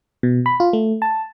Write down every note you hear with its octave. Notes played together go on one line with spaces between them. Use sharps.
B2
B5
F4
A3
A5